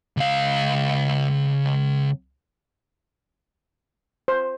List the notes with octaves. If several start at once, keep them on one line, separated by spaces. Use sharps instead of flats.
C#2 F5
C5